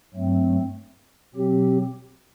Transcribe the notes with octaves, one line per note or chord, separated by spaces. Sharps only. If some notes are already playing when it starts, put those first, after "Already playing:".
G2 F#3 A3 C4
B2 F#3 C4 G4